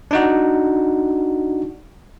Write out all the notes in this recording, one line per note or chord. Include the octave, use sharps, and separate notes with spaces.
D4 D#4 F#4